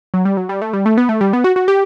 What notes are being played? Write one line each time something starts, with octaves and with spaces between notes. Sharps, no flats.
F#3
G3
F#3
G3
A3
G3
A3
B3
A3
G3
B3
F#4
F#4
G4